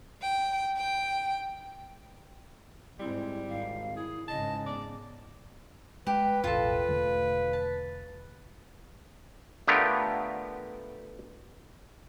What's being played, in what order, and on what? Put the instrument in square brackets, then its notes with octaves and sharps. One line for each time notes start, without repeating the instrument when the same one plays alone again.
[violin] G5
G5
[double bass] G#2 C4 [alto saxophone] G3 [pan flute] E4
[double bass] G#1 [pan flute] F5
[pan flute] E4 [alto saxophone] G#4
[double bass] G#2 C#3 [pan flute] D#5 [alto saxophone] A5
[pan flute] B3 [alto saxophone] D5
[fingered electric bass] G#3 [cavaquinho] G4 [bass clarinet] B4
[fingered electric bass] E1 A1 [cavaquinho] F4 A4
[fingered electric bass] E1 D3 A3
[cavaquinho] A5
[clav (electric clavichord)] D3 A3 B3 F4 G4 A#4